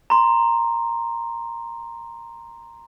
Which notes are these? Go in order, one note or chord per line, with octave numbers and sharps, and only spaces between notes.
A#5 C6